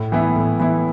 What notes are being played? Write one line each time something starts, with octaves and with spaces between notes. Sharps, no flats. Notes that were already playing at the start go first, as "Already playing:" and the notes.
Already playing: A2
E3 B3 E4
A2
E3 B3 E4